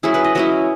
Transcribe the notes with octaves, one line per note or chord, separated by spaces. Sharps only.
F#3 C#4 E4 G#4
B4
D#5
F#3 C#4 E4 D#5